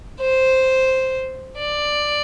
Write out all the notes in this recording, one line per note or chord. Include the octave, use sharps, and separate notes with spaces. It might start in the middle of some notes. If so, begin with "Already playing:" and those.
C5
D5